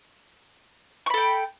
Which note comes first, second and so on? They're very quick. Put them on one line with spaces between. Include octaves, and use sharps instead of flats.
C#6 B5 A4 G5